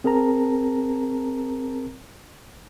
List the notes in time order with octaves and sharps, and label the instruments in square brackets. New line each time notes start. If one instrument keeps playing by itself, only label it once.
[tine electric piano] C4 G#4 A#4 A5 A#5